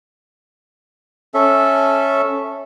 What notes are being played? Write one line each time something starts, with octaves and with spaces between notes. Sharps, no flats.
C#4 A4 E5